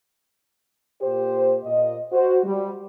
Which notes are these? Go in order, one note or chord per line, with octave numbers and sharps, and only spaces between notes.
A#2 G4 C5
A#2 D#5
F#4 C5
G3